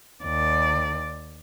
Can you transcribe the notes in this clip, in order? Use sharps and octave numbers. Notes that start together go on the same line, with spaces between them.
D#2 D5